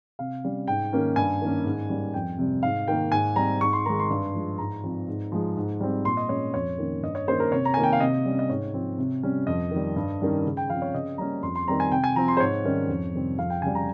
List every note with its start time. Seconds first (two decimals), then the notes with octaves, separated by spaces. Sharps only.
0.19 C3 F5
0.44 G3 C#4
0.68 G#2 G5
0.93 D#3 A#3 C#4
1.16 G2 G#5
1.41 D#3 A#3 C#4
1.65 G#2
1.90 G3 A#3 C#4
2.14 F2 G5
2.38 C3 G3
2.63 G#2 F5
2.88 D#3 A#3 G5
3.12 G#2 G#5
3.36 G3 C4 A#5
3.61 G#2 C#6
3.73 C6
3.86 D#3 G#3 A#5
4.00 C6
4.10 G2
4.34 F3 G#3
4.58 G#2 A#5
4.84 F3 C4
5.08 G#2
5.32 F3 G#3
5.57 G#2
5.81 G3 C4
6.05 A#2 C6
6.17 D#5
6.29 G#3 C#4 C#5
6.54 F2 C#5
6.78 D#3 A#3 C#4
7.02 G2 D#5
7.15 C#5
7.28 D#3 A#3 C#4 C5
7.40 A#4
7.52 C3 C#5
7.65 A#5
7.74 D#3 A#3 G#5
7.83 G5
7.93 F5
8.00 C3 D#5
8.26 G3 C#4
8.39 D#5
8.49 G#2 C#5
8.74 F3 C4
8.98 C3
9.23 G3 C#4
9.47 F2 D#5
9.71 D#3
9.76 G3
9.96 G2
10.21 D#3 G3 C#4
10.46 C#3
10.57 G5
10.69 F3 C4 F5
10.82 C#5
10.94 C#3 D#5
11.18 G3 A#3 C#4 A#5
11.43 F2 C6
11.56 C6
11.67 D#3 G3 C4 A#5
11.80 G#5
11.91 C3 G5
12.04 G#5
12.15 F3 C4 A#5
12.28 C6
12.37 C5
12.40 G#2 C#5
12.65 D#3 G3 C#4
12.89 F2
13.13 C3 D#3 G3 C4
13.38 F2 F5
13.50 G5
13.62 C#3 G3 G#5
13.75 A#5